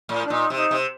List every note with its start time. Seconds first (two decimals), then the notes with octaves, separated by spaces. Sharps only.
0.09 A2
0.25 D4
0.30 A#2 D#4
0.50 C3
0.57 D#4
0.71 C3